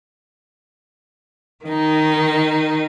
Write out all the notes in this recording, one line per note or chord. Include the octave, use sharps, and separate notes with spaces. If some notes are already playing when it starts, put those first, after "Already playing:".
D#3 D#4